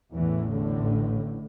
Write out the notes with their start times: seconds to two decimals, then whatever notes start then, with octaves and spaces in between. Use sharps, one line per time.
0.14 A1 E2 A2 E3
0.51 D3